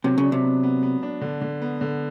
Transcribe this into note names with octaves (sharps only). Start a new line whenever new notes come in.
C3 F#3
C#3
D4
C3
B3
B3
B3
D4
D3
D3
B3
D3